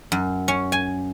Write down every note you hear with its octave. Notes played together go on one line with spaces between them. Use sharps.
F#2
C#4
G#5